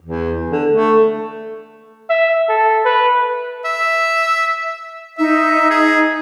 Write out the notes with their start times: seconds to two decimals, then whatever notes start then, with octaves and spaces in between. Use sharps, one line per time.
0.02 E2
0.50 D3
0.70 A3
2.10 E5
2.49 A4
2.85 B4
3.65 E5
5.18 D#4 E5
5.70 G#4